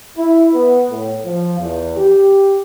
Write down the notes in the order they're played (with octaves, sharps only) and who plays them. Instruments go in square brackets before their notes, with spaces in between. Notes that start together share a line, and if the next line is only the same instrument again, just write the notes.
[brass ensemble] E4
B3
A2
F3
E2
G4